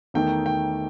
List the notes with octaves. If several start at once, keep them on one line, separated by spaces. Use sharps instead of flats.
E2 D#3 A3 D#4 G5
G5